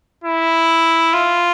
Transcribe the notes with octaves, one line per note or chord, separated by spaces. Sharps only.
E4
F4